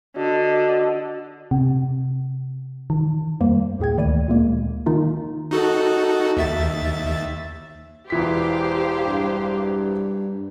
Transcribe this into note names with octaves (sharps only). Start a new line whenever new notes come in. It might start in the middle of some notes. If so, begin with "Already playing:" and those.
D3 F#4 D#5
C3
D#3
F2 G3 A#3 C5
D#2 A2 G#4 G5 G#6
D2 D#3 D5 B5 D#7
D2 A#2 G#3 A#3
D#3 D#4 F4
D#4 F#4 A4
D#2 E5 A6
E1 E3 G4 C5 F5 B6
G2